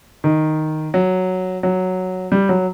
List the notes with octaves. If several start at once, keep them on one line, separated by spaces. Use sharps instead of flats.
D#3
F#3
F#3
G3
F#3